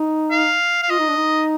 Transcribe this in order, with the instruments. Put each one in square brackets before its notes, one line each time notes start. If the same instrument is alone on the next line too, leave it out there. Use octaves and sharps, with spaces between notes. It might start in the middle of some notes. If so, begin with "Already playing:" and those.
Already playing: [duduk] D#4
[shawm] F5
F5
[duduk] F4 [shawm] D#5
[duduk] D#4
D4
D#4